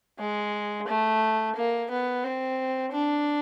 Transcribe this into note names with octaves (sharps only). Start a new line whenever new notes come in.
G#3
A3
A#3
B3
C4
D4